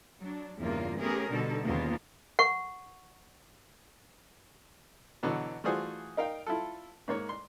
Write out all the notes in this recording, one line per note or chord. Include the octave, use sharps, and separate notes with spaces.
F#3 D4
E2 G2 C#3 G3 A#3 F4
A3 B3 C#4 G4 G#4 A#4
B2 D3 G3 D#4 A4
D#2 C#3 A#3 B3 F4
F#5 C#6
B2 D3 E3 F#3 B3
E3 A3 F4 F#4 G#4 C5
D#4 A#4 F5 G5
E4 F4 A4
G#2 A#3 C#5
C6